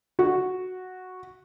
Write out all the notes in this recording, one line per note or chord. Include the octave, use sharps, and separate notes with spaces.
F#4